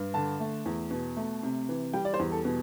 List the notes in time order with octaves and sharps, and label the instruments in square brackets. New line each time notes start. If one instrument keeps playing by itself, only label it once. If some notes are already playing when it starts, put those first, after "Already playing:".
Already playing: [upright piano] G2
D3 A5
A3
E2
B2
A3
C3
E3
G3 G5
D5
C5
E2
A4
B2